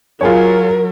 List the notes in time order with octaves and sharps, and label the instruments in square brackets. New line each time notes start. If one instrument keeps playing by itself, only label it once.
[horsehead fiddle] F#3 A#4 [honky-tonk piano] F4 G#4 C#5